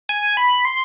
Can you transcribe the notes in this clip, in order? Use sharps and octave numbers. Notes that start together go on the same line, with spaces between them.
G#5
B5
C6